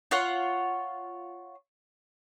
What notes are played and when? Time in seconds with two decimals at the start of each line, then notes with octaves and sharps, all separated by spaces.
0.11 F4 C#5 F#5